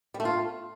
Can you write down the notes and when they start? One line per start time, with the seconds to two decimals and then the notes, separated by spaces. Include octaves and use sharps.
0.14 G3
0.20 A3
0.25 F4